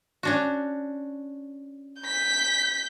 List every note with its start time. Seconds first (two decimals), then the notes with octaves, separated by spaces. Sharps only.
0.23 C#4 D4 F#4
2.02 G6 B6